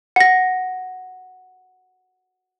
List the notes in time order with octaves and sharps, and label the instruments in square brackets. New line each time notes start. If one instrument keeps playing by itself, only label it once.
[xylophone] F#5 A#6